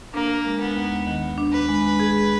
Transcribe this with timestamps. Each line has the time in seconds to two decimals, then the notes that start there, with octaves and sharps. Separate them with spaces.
0.14 A#3 D4
0.45 G#3
0.60 B3
0.76 D#2
1.07 D#3
1.38 D4
1.53 B4
1.69 G#3
2.00 G#4